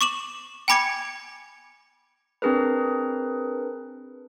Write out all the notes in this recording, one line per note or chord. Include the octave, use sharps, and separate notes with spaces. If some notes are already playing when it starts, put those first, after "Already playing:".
C#6 D6 E7 F#7
G5 G#5 B5 D6 G#6 C#7
C4 D4 G#4 A#4 B4